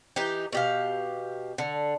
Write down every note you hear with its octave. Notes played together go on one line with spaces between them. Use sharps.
E3 D#4 G4
B2 G4 F5
D3